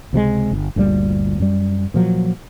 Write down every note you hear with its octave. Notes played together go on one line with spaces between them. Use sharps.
C#2 C3 F3 G#3
G1
G1 D2 A#2 G3
F#2 G3
A#2 F3 F#3